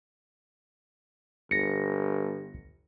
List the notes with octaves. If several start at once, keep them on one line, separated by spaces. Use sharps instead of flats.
G1 A#6 C#7